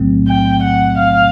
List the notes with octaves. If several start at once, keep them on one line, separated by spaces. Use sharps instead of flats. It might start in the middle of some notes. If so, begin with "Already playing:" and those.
Already playing: B1 A2 F#3 A3 C4
G5
F#5
F5